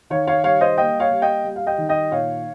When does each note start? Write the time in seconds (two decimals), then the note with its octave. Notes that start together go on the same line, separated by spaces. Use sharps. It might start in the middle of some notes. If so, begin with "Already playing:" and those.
0.10 D#3 C#5 F5
0.27 C#5 F5
0.44 G3 C#5 F5
0.61 C5 D#5
0.77 A#3 D#5 G5
1.00 C#5 F5
1.11 G3
1.22 D#5 G5
1.44 G3
1.56 F5
1.67 D#5 G5
1.78 D#3
1.89 D#5 G5
2.12 A#2 C#5 F5